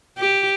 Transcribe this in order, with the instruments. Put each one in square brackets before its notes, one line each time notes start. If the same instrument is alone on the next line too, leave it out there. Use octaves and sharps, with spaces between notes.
[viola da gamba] G4